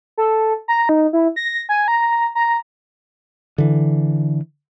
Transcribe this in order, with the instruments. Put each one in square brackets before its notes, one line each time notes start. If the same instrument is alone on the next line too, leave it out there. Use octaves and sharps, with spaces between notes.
[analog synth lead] A4
A#5
D#4
E4
A#6
G#5
A#5
A#5
[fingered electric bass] D3 E3